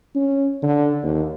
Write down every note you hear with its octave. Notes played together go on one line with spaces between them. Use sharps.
C#4
D3
D#2